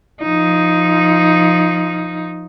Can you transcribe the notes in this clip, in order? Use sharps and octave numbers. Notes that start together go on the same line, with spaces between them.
F3 D#4